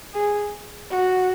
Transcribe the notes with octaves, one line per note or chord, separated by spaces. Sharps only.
G#4
F#4